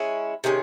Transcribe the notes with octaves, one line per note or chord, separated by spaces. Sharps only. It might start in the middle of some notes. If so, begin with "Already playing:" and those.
Already playing: G#3 C#4 E4
C3 D#3 G#3 C#4